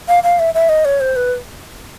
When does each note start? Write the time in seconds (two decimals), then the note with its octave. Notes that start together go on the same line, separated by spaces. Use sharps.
0.08 F5
0.23 F5
0.39 E5
0.54 E5
0.69 D#5
0.85 C#5
1.00 C5
1.16 B4